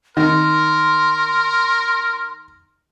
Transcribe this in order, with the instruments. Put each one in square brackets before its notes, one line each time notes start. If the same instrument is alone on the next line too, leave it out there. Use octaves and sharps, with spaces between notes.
[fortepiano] D#3 [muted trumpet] A#4 [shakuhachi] C6